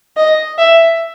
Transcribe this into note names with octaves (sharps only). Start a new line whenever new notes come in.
D#5
E5